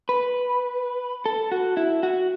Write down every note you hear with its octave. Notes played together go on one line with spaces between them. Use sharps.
B4
A4
F#4
E4
F#4